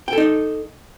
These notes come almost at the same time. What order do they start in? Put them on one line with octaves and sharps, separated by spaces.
G5 A4 D#4